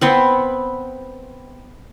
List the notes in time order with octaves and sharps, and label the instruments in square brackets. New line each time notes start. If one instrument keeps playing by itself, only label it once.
[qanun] B3 C4 F#5